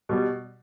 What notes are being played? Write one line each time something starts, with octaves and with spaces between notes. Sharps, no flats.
B2 G3